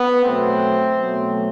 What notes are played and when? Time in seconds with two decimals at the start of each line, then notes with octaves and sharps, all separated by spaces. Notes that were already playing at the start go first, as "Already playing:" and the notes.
Already playing: B3
0.23 B2 F#3 A3 C4
0.99 B2 F#3 A3